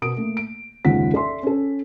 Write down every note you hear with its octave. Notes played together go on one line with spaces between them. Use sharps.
B2 A#4 D#6 D7
A3 A#3
D7
F#1 D#2 G#3 F4 F#5 B6
A4 D5 E5 C6
C#4 A4